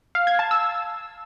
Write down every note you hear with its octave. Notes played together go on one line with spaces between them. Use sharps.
F5
G#6
A5
E6